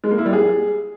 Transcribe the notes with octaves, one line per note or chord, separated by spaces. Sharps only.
G#3
A#3
E4
G3
G#4